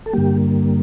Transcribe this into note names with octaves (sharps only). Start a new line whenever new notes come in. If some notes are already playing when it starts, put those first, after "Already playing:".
A4
G2 D3 G3 A#3 G4